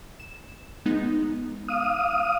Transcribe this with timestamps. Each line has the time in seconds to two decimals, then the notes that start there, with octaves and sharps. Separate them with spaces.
0.20 E7
0.86 G#3 B3 D#4
1.68 F5 D#6